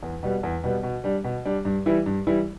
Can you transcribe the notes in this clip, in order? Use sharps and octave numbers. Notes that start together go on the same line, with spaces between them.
E2
B2 G3 B3
E2
B2 G3 B3
B2
G3 D4
B2
G3 D4
G2
E3 G3 E4
G2
E3 G3 E4